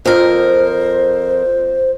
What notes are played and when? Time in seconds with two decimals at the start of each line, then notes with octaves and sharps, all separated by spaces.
0.05 F2 A#4 C5